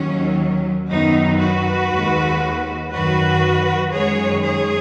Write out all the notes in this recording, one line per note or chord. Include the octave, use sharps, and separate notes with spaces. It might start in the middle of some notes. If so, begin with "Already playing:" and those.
Already playing: D#2 D#3 F#3 C#4
F#2 D#3 F#3 B3 D#4
F#4 B4
D#2 D#3 G#3
F#2 D#3 F#3 F#4 B4
F#2 D#3 G#3 G#4 C#5
G#4 C#5